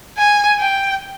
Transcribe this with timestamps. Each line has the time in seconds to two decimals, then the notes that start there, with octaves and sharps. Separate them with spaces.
0.17 G#5
0.59 G5